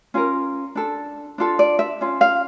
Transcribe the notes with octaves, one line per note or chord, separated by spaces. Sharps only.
C#4 F4 A#4
D4 A4
D4 F4 A4
D5
E5
C#4 F4
F5